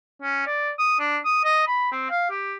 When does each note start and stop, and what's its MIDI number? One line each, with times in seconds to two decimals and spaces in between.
0.22 0.42 61
0.47 0.71 74
0.79 0.95 87
0.99 1.17 62
1.25 1.44 87
1.44 1.63 75
1.67 1.90 83
1.92 2.06 60
2.10 2.30 77
2.30 2.56 67